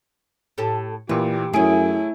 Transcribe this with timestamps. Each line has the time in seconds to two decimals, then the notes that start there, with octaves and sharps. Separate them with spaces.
0.58 A2 G4 A4
1.09 A#2 E3 A#3 G4 B4
1.54 F#2 A3 C#4 E4 G#4 G#5 D7